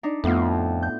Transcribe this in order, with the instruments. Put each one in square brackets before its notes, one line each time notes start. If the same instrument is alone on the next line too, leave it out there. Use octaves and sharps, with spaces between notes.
[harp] D4 D#4
[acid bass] F2 [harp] A2 B3 F4
[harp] G6